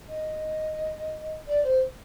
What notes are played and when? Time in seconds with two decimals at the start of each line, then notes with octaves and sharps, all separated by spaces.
0.08 D#5
1.47 D5
1.63 C5